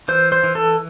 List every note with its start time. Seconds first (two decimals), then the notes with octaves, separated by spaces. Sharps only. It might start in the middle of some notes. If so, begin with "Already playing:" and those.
0.08 E3 C5
0.32 C5
0.44 E3
0.55 A4